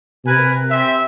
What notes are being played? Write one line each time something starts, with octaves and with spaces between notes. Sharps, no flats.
C3 A#4 B4 G#5
C4 E5